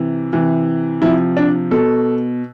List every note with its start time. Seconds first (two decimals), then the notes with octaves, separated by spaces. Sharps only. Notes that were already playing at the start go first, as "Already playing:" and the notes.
Already playing: C3 E3
0.33 C3 E3
1.02 C3 F3 E4
1.37 D4
1.71 B2 A4